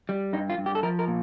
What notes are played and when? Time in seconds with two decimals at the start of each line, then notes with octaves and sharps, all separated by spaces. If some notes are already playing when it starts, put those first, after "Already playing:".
0.09 G3
0.33 G2 D#4
0.50 F4
0.58 G2
0.66 G4
0.75 A4
0.83 F3 A#4
0.99 A#4
1.08 A#2